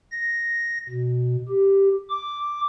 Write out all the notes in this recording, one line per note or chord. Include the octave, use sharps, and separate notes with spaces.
A#6
B2
G4
D6